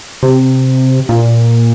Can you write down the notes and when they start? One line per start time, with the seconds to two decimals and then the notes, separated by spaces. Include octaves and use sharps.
0.23 C3
1.09 A#2